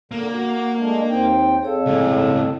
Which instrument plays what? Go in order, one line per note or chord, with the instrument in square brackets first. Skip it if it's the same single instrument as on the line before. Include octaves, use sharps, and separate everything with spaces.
[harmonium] A#2 D3 [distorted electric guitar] A#3
[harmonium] F#4
G#3 A3 D4
[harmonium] D#2 C4 G5 [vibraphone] D#4
[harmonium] F2 A4 [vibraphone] G#4 C#5 F5
[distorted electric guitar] C#2 A2